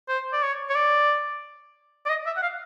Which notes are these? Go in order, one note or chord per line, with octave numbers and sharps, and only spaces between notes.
C5
D5
C#5
C#5
D5
D5
D#5
E5
F#5
F5